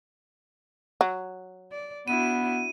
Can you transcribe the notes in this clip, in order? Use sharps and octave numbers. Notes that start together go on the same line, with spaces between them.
F#3
D5
B3 D4 E4 F#4 D#7